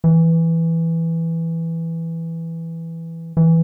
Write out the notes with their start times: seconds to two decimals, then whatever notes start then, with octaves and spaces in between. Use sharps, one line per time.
0.04 E3
3.37 E3